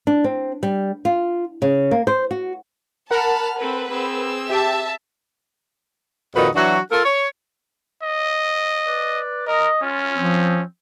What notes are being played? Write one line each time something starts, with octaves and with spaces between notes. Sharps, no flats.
D4
C4
G3
F4
C#3
A#3
C5
F#4
A#4 F#5 A5 B5 F6
C4 A4 B4
C4 G#4 E6
G4 E5 A5
F2 A#2 D#3 D#4 F#4 B4
E3 F#3 D4 F#4
F4 A4 A#4
C#5
D#5
B4 D5
A#4 D#5
C#4 F4
F3 C4